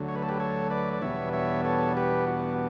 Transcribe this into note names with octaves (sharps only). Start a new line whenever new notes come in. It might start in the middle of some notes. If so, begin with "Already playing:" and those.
Already playing: D2 D3 F#3
C#5
B4
A4
G4 B4
A4 C#5
B4 D5
D5
E2 B2 G3 B3 D4 C#5 E5
C#5 E5
A4 C#5
G4 B4
F#4